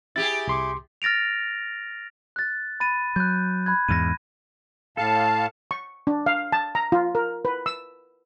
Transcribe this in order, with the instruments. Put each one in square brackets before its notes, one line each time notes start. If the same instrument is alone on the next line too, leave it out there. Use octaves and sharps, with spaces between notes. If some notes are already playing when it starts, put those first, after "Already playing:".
[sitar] E4 G4 G#4 [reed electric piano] A6
[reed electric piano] C2 C6 D6
[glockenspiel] F6 A6 A#6 D7 F7
F#6 A6
B5 A6 D#7
[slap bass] F#3 [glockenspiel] F#6 G6
[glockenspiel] B5 F#6 G#6
[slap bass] E2 G#2 [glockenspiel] A#6 D#7
[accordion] A2 F5 A5 [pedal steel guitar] A4
[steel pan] C#6
D4
F5
A5
A#5
F4
A#4
B4
E6